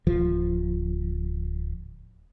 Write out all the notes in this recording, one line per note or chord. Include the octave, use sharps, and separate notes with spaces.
D1 F3